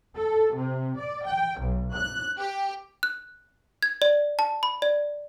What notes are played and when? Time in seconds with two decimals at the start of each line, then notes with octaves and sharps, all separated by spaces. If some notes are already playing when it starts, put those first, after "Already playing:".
0.15 A4
0.55 C3
0.98 D5
1.26 G5
1.60 B1
1.94 F#6
2.38 G4
3.03 F#6
3.83 G#6
4.02 D5
4.39 A5
4.63 B5
4.82 D5